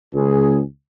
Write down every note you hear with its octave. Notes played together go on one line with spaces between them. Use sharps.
C#2 G#4